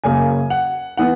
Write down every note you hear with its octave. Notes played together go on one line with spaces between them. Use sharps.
F#2 C#3 F#3 A#3 G#5
F#5
E3 B3 F#5